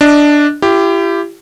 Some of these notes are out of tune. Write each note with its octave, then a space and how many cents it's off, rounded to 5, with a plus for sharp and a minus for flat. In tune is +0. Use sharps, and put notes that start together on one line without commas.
D4 +0 D#5 +15
E4 +40 G4 +0